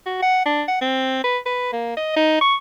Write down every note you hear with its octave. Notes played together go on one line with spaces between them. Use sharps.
F#4
F#5
D4
F#5
C4
B4
B4
A#3
D#5
D#4
C#6